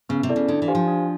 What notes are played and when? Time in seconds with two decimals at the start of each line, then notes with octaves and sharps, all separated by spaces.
0.09 C#3 B3
0.23 C3
0.29 E4 A4 D5
0.36 C#3
0.48 D3 D4
0.62 E3
0.68 G4 C5 F5 G#5
0.75 F3
0.88 D4